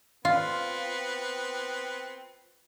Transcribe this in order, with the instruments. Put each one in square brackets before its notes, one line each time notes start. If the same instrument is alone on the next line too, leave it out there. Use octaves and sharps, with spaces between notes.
[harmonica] B3 C4 [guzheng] F4